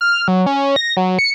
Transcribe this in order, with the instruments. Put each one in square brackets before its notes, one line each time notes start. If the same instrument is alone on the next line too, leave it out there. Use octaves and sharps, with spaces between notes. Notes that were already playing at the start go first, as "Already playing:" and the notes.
[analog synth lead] F6
F#3
C#4
A#6
F#3
C#7